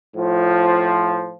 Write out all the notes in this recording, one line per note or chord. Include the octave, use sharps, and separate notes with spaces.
A2 F3